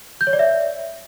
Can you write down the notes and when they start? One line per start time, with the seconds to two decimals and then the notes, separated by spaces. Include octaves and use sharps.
0.21 G6
0.27 C#5
0.33 D5
0.39 E5